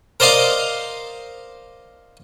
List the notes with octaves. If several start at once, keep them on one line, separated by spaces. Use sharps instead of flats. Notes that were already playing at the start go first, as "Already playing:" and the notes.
A#4 C5 D5 D#5 F5 A#5